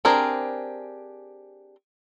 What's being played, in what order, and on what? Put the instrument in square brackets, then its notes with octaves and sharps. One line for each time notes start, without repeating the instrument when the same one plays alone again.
[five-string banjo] C4 D4 G4 G#4 A#4